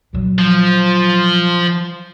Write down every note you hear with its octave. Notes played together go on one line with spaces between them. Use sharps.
A#2 F#3
F3